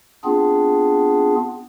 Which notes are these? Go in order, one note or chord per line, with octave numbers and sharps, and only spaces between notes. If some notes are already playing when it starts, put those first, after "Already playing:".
B3 C4 D4 F4 G#4